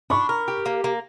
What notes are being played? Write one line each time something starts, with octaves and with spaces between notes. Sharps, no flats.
D4 B5 C#6
A#4
G4
A#3
A#3